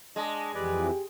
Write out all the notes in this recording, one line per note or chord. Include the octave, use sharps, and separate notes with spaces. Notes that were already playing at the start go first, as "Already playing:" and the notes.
G#3 D4 D#5
F2 E3 G4 B4 D5